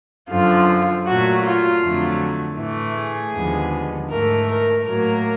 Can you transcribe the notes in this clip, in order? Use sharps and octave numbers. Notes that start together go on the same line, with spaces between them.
F#2 D3 F3 F4
A#2 F#3 A3 F#4
F4
F2 D3 F#3 A3
A2 E3 A3
G#4
D#2 D3 F3 G#3 B3
G#2 E3 A3 A#4
A#4
A2 F#3 A#3 A#4